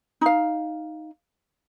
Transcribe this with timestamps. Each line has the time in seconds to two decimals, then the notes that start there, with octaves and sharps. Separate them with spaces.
0.21 D#4 F5